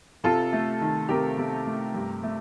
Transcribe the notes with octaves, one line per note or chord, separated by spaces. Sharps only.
C3 F4 A4
A3
D#3
C3 G4 A#4
C3
A3
G2
A3